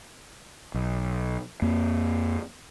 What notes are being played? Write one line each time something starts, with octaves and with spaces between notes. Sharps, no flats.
B1
F2 A#3